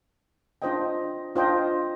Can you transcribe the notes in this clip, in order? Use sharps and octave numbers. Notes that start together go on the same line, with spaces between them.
D4 F4 C5 D#5 G5
D4 F4 C5 D#5 G5